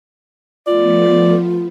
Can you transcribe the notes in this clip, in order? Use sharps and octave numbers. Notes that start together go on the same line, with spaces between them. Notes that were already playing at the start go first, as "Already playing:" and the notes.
F3 A3 B3 F4 D5